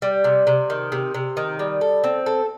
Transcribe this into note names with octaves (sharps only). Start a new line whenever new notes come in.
G3
C3
C3
D#3
C3
C3
D#3
G3
A4
C4
A4